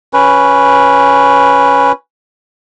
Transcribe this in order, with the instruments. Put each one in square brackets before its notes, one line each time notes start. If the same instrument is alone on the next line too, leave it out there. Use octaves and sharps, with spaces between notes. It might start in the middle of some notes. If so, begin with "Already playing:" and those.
[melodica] C#4 B4